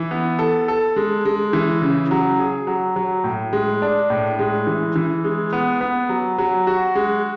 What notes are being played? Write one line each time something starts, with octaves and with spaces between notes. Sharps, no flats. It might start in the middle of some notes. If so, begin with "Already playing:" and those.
Already playing: E3
B3
A4
A4
G#3
G#3
E3
C#3
F#3
G#4
F#3
F#3
A2
G#3
D4
A2
G#3
E3
E3
G#3
B3
B3
F#3
F#3
F#4
G#3